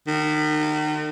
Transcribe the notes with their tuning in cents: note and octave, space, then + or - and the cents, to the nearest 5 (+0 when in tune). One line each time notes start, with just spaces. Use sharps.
D#3 -35